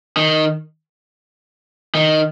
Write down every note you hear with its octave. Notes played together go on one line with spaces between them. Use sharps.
D#3
D#3